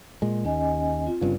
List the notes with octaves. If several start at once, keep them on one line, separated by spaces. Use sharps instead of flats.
A#2 G#3
D#2 C#4 D#5 G#5
C4 F4
G1 G2 C#3